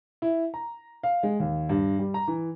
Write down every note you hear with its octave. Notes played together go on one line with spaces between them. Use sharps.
E4
A#5
F5
G#3
D#2
G2
G3
A#5
E3